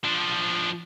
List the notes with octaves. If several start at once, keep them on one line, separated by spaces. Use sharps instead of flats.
F3 D4